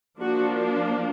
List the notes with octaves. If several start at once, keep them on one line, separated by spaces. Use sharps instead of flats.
F3 A#3 D4 F#4